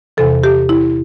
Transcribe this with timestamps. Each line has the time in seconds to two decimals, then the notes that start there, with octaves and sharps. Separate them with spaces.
0.17 E2 C3 E3 A4
0.43 G4
0.69 E4